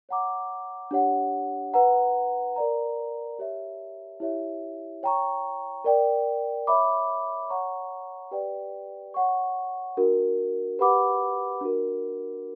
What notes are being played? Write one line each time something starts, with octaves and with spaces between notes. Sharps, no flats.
C#5 F#5 A#5 D6
D4 G4 C#5 F#5
B4 F#5 A#5
A#4 D5 A#5
G4 C#5 E5
E4 G4 C#5 E5
C#5 G5 A#5 C#6
A#4 D5 G5
C#5 E5 B5 D6
C#5 F#5 A#5 C#6
G4 B4 D5 G5
C#5 F#5 C#6
D4 F#4 A#4
G4 B4 F#5 B5 D6
D4 F#4 A#4